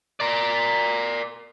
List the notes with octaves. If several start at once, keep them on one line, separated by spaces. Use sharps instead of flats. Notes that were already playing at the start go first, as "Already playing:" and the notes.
A#4 D5